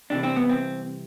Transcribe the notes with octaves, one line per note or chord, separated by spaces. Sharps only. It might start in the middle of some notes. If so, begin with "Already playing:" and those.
C2 C3 E3 D4
C4
B3
C4